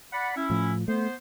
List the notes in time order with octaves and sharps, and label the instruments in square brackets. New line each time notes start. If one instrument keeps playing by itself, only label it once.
[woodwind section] D5 F#5 B5
C#4 E4
[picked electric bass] A2 F3
[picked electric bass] A3 [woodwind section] B3 C5